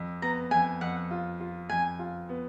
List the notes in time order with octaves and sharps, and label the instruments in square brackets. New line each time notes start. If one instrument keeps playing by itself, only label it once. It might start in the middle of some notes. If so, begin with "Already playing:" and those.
Already playing: [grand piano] F2
[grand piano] B3 [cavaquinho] A#5
[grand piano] F2 [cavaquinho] G#5
[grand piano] F2 [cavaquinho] F#5
[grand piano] F4
F4
[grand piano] F2 [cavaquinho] G#5
[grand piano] F4
B3